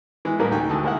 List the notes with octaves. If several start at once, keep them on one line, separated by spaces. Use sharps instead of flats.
E3 G#3 B3
A1 G3 G#3 A#3 A#4 B4
D2 D#4 G5 G#5
D2 D3 A5 D#6
G#3 A#3 E4 A#4 F#5